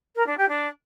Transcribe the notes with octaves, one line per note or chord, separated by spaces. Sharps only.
A#4
D4
G4
D4